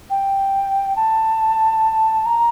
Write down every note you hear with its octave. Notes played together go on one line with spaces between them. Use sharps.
G5
A5
A#5